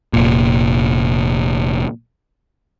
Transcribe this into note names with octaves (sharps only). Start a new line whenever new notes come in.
F1 A#2